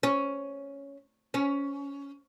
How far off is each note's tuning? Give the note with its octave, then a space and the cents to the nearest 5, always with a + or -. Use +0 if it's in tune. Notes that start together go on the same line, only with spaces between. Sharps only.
C#4 +5
C#4 +15